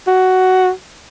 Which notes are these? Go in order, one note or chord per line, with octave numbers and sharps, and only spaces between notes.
F#4